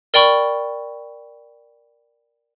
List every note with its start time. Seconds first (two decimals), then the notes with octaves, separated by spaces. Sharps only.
0.14 A#4 D5 G5 B5 C#6